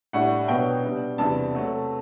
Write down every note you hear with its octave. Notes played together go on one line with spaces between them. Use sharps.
A2 G3 D4 F#5
B2 F#3 B3 D4 G5
B2 G3 D4
E2 C3 G3 D4 A5
C3 F#3 A3